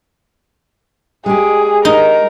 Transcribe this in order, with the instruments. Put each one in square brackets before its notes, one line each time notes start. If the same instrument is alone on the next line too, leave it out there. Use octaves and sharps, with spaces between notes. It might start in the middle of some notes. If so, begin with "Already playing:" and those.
[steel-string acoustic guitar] G#3 G4 [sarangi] G#4
[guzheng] D#4 [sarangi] A#4